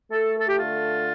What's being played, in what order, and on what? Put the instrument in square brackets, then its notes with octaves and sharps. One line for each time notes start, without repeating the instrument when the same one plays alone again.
[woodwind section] A3 A4
A4
G4
D3 F4